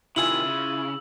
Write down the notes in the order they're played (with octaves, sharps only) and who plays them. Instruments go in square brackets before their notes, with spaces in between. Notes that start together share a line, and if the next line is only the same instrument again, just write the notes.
[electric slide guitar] C3 D#3 [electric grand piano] E4 F4 G#5 [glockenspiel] E6 F#7
[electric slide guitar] C#3